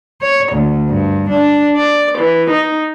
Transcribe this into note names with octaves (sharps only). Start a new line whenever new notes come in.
C#5
D2
G2
D4
D5
E3
D#4